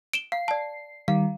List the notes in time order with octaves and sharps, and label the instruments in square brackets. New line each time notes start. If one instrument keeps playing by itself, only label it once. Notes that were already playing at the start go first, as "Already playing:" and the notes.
[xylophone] D7 E7 G7
[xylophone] F5 [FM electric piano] C7
[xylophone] D5 A5
[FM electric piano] D#3 G3 [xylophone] F5